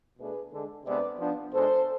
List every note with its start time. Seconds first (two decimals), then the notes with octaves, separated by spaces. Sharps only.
0.19 B2 A3 D4 G#4 B4
0.53 D3 G#3 D4
0.86 C3 G#3 B3 D4 B4 D5
1.20 F3 B3 D4
1.53 B2 G#3 D4 A4 C5